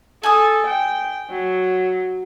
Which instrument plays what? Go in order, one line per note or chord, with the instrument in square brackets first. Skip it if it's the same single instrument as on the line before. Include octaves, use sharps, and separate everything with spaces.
[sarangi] A4 [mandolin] G#5 D#6
[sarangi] G5
F#3